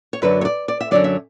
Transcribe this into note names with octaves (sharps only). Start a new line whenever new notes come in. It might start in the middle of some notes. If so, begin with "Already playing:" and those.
C#5
F#2 D3 F#3 B4
C#5
D5
D5
E5
F#2 D3 F#3 D5
E5